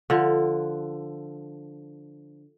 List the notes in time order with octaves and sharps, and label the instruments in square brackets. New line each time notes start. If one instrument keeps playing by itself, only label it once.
[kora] D3 F3